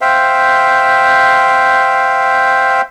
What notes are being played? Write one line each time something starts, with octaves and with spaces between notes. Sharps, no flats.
C5 E5 F5 G5